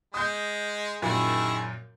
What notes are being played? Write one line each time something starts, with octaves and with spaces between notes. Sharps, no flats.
G#3 D#6 G6
F#2 A#2 D#3 A#3 E4 G#4